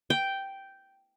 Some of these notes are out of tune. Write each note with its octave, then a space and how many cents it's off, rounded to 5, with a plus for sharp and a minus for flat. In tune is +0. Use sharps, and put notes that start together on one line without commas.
G5 -5